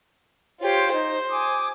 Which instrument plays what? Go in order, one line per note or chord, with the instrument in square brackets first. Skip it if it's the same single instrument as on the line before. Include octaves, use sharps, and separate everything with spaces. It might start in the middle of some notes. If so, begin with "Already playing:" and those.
[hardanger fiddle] F4 G4 [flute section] C5 C#5 F5
[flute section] D#4 [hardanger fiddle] C5
[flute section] G#5 D6 D#6